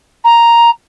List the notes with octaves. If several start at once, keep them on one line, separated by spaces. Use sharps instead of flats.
A#5